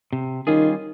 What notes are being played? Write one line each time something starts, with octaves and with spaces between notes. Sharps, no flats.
C3
D#3 G3 C#4 F4 G#4